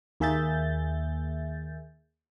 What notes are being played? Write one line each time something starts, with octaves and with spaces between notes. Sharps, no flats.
D#2 A#3 G#4 E5 G6 A6